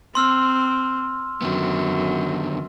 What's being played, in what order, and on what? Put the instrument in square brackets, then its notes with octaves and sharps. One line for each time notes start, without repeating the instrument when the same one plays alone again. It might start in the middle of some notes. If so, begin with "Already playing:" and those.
[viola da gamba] C4 [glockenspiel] C6 E6 F6
[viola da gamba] F#2 [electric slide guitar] D3 D#3 B3